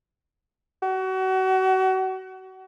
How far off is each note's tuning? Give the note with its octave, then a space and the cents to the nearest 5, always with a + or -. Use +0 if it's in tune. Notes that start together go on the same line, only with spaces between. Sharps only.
F#4 +30